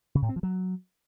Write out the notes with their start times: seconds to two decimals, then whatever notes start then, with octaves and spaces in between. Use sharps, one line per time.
0.15 C#3
0.22 A2
0.29 C4
0.36 F3
0.43 F#3